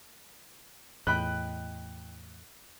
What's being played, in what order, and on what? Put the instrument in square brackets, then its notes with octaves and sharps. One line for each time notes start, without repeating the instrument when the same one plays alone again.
[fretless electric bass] E2 A2 [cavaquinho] D#5 G5 B5 [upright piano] F#6